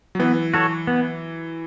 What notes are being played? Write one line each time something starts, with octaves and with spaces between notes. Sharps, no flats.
F#3
E3 B3
F#4 A4 C#5
B3